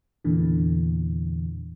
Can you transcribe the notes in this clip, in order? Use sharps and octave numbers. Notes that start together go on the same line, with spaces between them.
E2 A#2 D3 E3